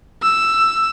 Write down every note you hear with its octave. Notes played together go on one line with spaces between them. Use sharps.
E6